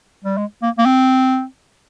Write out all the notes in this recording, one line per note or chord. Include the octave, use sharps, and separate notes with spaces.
G3
G#3
A#3
A#3
C4